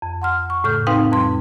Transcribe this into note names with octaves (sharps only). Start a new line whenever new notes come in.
F2
F#5 C6 F6
C#6
A2 C#3 A3 F6 G6
C4 D#4 B4 F5 G5 C6
F2 G3 C6